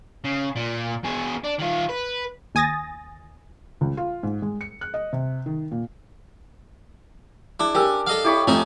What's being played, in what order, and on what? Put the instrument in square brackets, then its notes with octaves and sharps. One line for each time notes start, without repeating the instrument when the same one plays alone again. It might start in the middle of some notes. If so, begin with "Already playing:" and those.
[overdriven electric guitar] C#3
A#2
B2 G#4
D4
D#3 F4
B4
[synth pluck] D#2 G#5 D#6 A6 A#6
[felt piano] C#2
F4
G#2
G#3
C#7
F#6
D#5
C3
D#3
A#2
[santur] D4 G#4 [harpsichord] E4
[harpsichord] C#4 [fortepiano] G4 A#4 E6 [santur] G5
[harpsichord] A4 D#5 F5
[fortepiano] E4 [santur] G4 C#5 B5
[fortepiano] F2 [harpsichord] A3 C#4 D#4